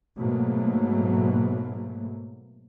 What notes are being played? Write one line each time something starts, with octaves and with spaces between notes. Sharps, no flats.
G#2 B2 F#3 A3 A#3